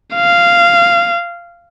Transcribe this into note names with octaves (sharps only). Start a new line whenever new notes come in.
F5